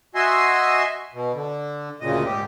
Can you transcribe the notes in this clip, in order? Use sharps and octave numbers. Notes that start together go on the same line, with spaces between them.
F#4 D#5 E5 G#5 C6
B2
D3
D2 A#2 C#3 D#5
G#2 G4